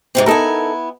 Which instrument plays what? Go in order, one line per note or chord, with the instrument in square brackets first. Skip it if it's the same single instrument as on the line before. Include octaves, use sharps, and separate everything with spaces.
[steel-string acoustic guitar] G#2 C3 C4
[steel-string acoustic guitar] B3 E4 G#5 [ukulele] D#4 A4 A#4